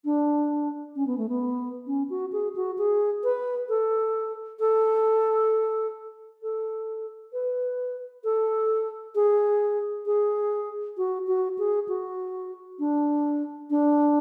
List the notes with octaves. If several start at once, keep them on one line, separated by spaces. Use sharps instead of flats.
D4
C#4
B3
A3
B3
C#4
F#4
G#4
F#4
G#4
B4
A4
A4
A4
B4
A4
G#4
G#4
F#4
F#4
G#4
F#4
D4
D4